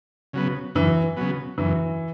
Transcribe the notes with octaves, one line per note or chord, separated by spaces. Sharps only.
C#3 F#3 B3
F#2 E3
C#3 F#3 B3
F#2 E3